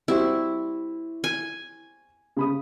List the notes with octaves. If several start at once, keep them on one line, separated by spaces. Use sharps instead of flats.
G3 C4 E4 F#4
G#5
C#3 B5 D#6